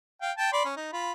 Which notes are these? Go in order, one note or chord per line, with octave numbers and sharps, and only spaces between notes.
F5 G5
G5 A5
D5 B5 C6
C#4
D#4
F4 B5